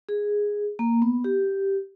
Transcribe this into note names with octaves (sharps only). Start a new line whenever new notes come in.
G#4
A#3
B3
G4